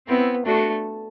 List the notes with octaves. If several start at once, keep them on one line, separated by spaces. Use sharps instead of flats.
B3 C4 E4
A3 D4 F#4